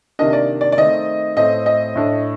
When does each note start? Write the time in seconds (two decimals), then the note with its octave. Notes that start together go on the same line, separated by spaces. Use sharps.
0.19 C3 D#3 A#3 D4 D#5
0.33 D5
0.61 D5
0.72 D5
0.78 D#3 A3 C4 D#5
1.36 A2 A3 C4 D#5
1.66 D#5
1.95 A2 A3 D4